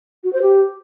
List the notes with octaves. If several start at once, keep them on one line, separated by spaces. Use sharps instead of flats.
F#4
C5
G4